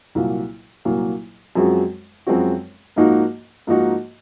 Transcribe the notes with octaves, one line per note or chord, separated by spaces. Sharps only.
C2 A#2 F#3 A#3 F4
C2 A#2 F#3 A#3 F4
F#2 F3 G#3 C4 F#4
F#2 F3 G#3 C4 F#4
G#2 F3 A#3 D#4 F#4
G#2 F3 A#3 D#4 F#4